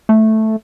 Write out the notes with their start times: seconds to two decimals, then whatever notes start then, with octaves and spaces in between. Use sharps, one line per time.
0.09 A3